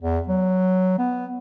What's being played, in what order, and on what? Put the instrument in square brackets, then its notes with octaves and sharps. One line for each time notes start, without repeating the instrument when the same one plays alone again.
[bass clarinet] E2
F#3
B3